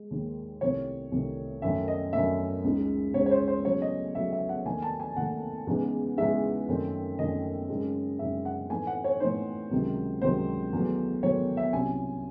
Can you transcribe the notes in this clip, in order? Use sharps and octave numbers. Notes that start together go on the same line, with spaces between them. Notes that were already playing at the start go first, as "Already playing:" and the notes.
Already playing: G#3
D#2 D#3 G#3
C2 C3 D#3 A3 C#5
C2 C3 D#3 A3
F#2 D#3 A3 E5
D#5
F#2 D#3 A3 E5
C#2 C#3 G#3 D#4
C#2 C#3 G#3 D#4 C#5
C#5
C5
C5
E2 C#3 F#3 A3 C#5
D#5
E2 C#3 F#3 A3 E5
E5
F#5
D#2 D#3 A3 G#5
A5
G#5
D#2 D#3 A3 F#5
E2 C#3 E3 G#3 D#4
E2 C#3 E3 G#3 D#4 E5
F#2 D#3 A3 C4 D#4
F#2 D#3 A3 C4 D#4 D#5
F#2 C#3 G#3 C4 D#4
F#2 C#3 G#3 C4 D#4 E5
F#5
A2 E3 A3 C4 D#4 G#5
F#5
C#5
A2 E3 A3 C4 D#4 C5
C#2 C3 D#3 F#3
C#2 C3 D#3 F#3 C5
E2 D#3 F#3 A3
E2 D#3 F#3 A3 C#5
E5
C2 C3 F#3 C#4 G#5